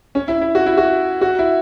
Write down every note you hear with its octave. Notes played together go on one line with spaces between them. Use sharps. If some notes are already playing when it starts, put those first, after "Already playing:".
C#4
E4
E4
F#4
E4
F#4
F#4
E4